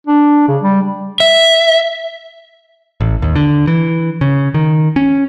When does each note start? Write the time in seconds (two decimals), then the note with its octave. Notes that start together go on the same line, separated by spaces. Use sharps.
0.07 D4
0.49 C#3
0.63 G3
1.20 E5
3.01 A1
3.22 D#2
3.35 D3
3.67 E3
4.21 C#3
4.54 D#3
4.96 C#4